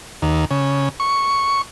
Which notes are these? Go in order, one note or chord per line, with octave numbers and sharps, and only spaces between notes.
D#2
C#3
C#6